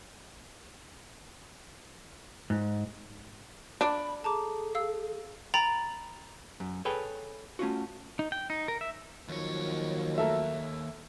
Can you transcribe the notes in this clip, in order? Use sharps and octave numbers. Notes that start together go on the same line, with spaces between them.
G#2
D4 B5
G#4 A4 A5 A#5 D6
F5 E6
G5 A#5 B5 A6 F7
F#2
G#4 A4 B4 C#5 G5
A3 C#4 F4 F#4
D#4
G5
D#4
A#4
E5
D#2 D#3 F3 F#3 C#5
A3 A4 A#4 E5